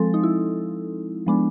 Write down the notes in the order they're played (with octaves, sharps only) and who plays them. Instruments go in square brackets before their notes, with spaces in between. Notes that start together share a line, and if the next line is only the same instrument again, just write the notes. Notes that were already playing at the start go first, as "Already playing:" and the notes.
Already playing: [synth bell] F3 G#3 C4 A4
D#4
E4
F3 G#3 B3 D4